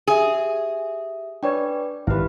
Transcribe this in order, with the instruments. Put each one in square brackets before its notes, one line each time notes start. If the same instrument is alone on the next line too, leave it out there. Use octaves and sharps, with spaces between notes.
[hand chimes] G4 E5 [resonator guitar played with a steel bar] G#4
[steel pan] D4 C#5 G#5 [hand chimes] B4 D5 G5
[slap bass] G#1 [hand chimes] E4 G4 [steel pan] B4 F5